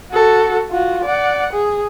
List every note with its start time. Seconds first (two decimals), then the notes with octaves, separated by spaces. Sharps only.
0.11 F#4 A4
0.71 F4 F#4
1.05 D5 F#5
1.53 G#4